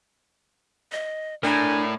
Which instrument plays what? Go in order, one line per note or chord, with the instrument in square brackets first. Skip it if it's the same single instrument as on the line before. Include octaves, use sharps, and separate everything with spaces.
[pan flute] D#5
[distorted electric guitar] A2 [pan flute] D4 [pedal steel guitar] A#4 D5 A#5 [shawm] G#5